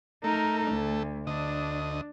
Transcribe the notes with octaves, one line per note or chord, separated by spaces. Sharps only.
A3 D#4 A#4
D2
D2 D4 D#5